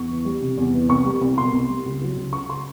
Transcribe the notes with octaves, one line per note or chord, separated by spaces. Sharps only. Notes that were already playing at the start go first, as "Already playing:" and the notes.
Already playing: E2 C#6
E3
G3
C3
E2
E3
C2 C#6
G3
C2
B2 C6
C2
G3
C#2
F#3
C#2
C#3 C#6
C6